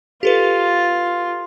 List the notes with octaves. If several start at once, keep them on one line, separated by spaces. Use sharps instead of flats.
F4 G4 A4 B4